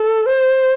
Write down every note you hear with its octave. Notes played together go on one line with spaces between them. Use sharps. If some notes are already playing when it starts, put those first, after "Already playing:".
Already playing: A4
C5